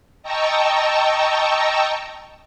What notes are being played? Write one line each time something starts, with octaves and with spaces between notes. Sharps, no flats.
D#5 G5 A5 A#5 C#6 E6